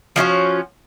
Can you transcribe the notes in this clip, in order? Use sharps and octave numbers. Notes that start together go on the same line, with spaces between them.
F3 C#4 E4 F#4